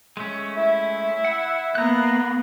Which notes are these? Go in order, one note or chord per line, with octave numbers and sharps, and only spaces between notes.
G#3 A3 C#4
E4 E5
F#5
A#3 B3 A#5 F#6